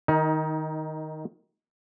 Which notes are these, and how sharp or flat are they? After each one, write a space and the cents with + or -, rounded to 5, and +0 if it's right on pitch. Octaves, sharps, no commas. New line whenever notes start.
D#3 +0 D#4 +25